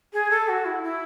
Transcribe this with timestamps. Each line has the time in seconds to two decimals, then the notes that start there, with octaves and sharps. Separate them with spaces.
0.13 G#4
0.30 A4
0.48 F#4
0.65 E4
0.83 E4